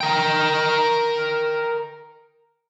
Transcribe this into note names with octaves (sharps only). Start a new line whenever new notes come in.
A#4 G5